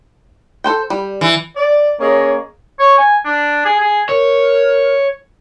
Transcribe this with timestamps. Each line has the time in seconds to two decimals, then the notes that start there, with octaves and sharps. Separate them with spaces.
0.64 A4 C5 G5
0.90 G3
1.21 E3
1.56 D5
2.00 A#3 C#4 G#4 C#5 D#5
2.80 C#5
2.98 G#5
3.25 D4
3.65 G#4
3.80 G#4
4.09 A#4 C#5